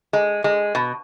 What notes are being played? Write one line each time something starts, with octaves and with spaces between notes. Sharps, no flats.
G#3
G#3
B2